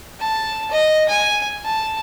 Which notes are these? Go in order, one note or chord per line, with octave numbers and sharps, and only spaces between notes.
A5
D#5
G#5
A5